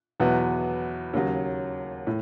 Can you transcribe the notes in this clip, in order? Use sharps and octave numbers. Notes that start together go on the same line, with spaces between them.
E2 B2 F#3 B3 E4
D#2 C#3 F#3
A2